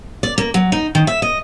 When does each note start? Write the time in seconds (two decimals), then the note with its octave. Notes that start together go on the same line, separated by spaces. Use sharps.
0.23 D5
0.38 A#3
0.54 F#3
0.72 D#4
0.95 D#3
1.07 E5
1.22 D#5